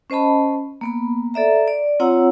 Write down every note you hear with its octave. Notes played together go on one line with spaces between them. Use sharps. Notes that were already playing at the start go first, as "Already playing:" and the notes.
C#4 C5 D#5 A5 B5
A#3 B3 B5
A4 D5 E5 A#5
D5
C4 F4 C#5 F#5 A#5 E6